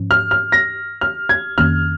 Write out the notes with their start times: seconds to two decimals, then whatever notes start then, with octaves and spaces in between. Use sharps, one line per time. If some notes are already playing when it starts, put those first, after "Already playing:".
Already playing: G#2 F3 C#4
0.11 F6
0.31 F6
0.52 A#6
1.01 F6
1.29 G#6
1.57 F2 D#3 A#3 C#4 F6